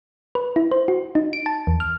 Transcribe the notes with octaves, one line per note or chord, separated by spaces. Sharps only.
B4
E4
C5
F#4
D#4
D7
A5
E2
F6